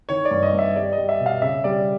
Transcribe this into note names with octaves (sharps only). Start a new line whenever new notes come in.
D#3 C#5
D5
G2
D#5
G2
E5
G3 D5
D#5
G3
E5
B2
F5
C#3 E5
G3 D5